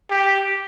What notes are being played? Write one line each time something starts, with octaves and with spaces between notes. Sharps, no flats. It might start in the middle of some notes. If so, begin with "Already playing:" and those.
G4